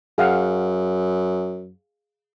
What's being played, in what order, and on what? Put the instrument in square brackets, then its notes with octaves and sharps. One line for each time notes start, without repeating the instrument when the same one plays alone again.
[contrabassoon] F#2 [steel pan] G#4 F5 F#5